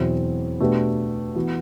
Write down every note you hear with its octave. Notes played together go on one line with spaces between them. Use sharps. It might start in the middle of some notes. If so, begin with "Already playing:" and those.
Already playing: E2 B2 F#3 C4 E4
B2 A3 D4 G4 B4
E3 B3 F#4